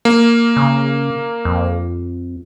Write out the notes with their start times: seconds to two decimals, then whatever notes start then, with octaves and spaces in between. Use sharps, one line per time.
0.05 A#3
0.56 C#3
1.45 F2